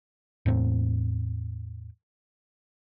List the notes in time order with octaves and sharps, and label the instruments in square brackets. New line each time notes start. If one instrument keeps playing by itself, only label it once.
[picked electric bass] E2 A2 C4